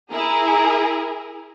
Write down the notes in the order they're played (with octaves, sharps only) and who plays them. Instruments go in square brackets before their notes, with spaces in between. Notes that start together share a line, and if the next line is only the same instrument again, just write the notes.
[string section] E4 G#4 A#4